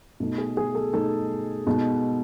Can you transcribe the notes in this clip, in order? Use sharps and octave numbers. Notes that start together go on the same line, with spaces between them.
B2 A3 D#4
G#4
G#4
A4
B2 A3 D#4 A4
B2 G#3 D#4